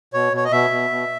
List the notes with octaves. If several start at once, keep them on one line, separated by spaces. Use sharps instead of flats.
B2 C#5
B2 C#5
D#5
B2 E5
B2
B2